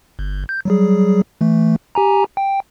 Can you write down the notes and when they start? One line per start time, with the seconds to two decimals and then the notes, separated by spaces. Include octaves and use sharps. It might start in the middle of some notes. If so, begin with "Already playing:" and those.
0.19 G1
0.49 G6
0.65 F#3 G3 G#4
1.41 E3 A3
1.95 G4 G#5 A#5
2.37 G5